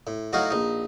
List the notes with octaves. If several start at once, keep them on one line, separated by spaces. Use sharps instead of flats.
A2
A2 F#3 D#4 F#4 F5
A#1 D#4